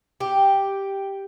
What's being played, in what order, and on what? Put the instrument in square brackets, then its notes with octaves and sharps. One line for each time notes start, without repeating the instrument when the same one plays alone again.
[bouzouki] G4